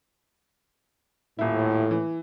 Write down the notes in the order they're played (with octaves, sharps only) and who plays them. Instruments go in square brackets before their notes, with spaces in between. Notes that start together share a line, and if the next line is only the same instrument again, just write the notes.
[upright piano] D#1 E4 [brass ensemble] A2
[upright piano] E3